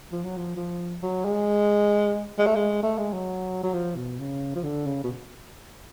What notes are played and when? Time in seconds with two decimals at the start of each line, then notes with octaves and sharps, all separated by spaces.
0.12 F3
0.24 F#3
0.37 F3
0.56 F3
1.03 F#3
1.25 G#3
2.38 G#3
2.46 A3
2.56 G#3
2.83 A3
2.98 G#3
3.13 F#3
3.63 F#3
3.73 F3
3.96 B2
4.19 C#3
4.55 F3
4.63 D3
4.86 C#3
5.04 B2